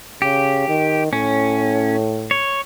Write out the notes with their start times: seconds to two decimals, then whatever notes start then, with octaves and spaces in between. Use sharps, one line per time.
0.22 C#3 G4
0.69 D#3
1.13 A2 C#4
2.31 C#5